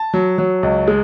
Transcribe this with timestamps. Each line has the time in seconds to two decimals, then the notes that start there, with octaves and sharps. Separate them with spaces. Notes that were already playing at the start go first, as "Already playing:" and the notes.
Already playing: A5
0.14 F#3
0.38 F#3
0.63 C#2
0.88 G#3